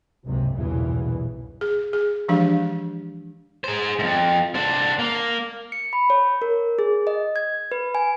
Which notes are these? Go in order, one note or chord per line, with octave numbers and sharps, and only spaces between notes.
F#1 C#2 G#2 C3
B1 E2 G2 A#2 C#3 E3
G#4
G#4
E3 F3 G#3 D4 G4 F5
G#4 C5
F2 G#2
D4 C5
A#3
C#7
B5
C#5
A#4
G#4
D#5
G#6
B4
G#5